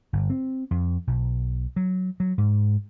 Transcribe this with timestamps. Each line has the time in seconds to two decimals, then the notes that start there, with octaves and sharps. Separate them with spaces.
0.13 G1
0.30 C4
0.71 F2
1.07 B1
1.76 F#3
2.20 F#3
2.38 G#2